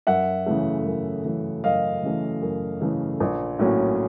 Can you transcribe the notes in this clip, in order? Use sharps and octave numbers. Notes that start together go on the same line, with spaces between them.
F#2 E5 F#5
C#3 E3 A3
F#2
C#3 E3 A3
F#2 D#5 F5
C#3 E3 A3
F#2
C#3 E3 A3
A#1
A2 F#3 A#3 C#4